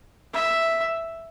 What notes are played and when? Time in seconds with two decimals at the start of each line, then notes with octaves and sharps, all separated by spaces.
0.33 E5